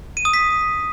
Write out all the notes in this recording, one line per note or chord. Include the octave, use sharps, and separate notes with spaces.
D#7
D#6
B6